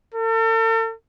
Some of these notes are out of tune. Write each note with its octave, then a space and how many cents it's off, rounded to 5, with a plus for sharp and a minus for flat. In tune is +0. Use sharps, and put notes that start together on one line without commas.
A4 +45